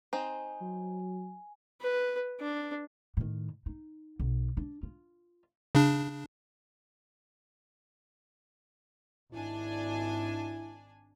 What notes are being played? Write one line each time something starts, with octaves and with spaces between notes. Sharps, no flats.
C4 D#4 C5 G#5
F#3
B4
D4
A2 D#3
D#4
B1
D4
F4
C#3 D4
G#1 D4 E4 G#5